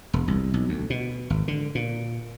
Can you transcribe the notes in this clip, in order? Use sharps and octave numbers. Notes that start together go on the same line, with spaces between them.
E1
C2
B1
D2
B2
G#1
D3
A#2